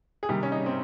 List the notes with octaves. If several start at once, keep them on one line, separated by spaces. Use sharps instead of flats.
G#4
C3 D#3 G3 G4
C#4
D#4
C4